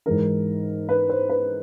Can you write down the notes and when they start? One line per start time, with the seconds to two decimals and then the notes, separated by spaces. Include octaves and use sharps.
0.06 G#2 E3 G#3 A#4
0.89 B4
1.09 C5
1.29 B4